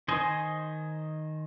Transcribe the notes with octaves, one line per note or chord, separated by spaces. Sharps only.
D#3 C5 D#5 G#5